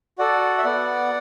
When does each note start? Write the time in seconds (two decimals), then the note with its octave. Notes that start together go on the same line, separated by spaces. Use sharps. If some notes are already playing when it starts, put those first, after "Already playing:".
0.19 F#4 A4 D5 F#5
0.58 E5
0.65 B3 D5 F#5